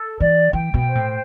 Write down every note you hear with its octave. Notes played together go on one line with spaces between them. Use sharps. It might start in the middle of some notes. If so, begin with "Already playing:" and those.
Already playing: A4
E3 D5
E3 G5
B2
C5
A2